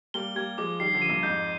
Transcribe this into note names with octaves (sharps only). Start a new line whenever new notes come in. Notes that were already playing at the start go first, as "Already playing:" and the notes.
G3 A#3 G7
G3 A#3 G#6
F3 G#3 D6
D#3 G3 C7
D3 F3
D#7
G2 A#2
F2 G#2 G6